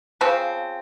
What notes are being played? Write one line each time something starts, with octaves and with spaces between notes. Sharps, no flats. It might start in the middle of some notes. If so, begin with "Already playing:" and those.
C#3 F3 C4